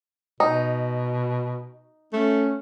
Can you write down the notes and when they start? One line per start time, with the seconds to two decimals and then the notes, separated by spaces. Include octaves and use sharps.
0.40 B2 D#4
2.13 A3 C#4